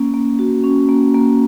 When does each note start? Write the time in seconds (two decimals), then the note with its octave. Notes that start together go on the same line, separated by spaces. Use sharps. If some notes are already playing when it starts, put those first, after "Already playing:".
Already playing: A#3 C#4
0.14 A#3
0.39 F#4
0.64 C#4
0.89 A#3
1.15 A#3